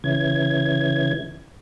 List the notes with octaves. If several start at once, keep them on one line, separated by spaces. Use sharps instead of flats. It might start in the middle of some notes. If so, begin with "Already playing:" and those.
C#3 E3 G#6